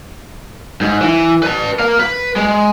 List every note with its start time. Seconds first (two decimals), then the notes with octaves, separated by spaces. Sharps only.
0.81 G#2
1.01 E3
1.43 B4 A5
1.79 A#4 F5
2.00 B4
2.36 G#3